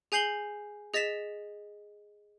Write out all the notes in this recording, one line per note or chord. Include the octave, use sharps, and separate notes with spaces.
G#4 G#5 G6 C7 F#7 G7
G#4 D#5 A6 B6 E7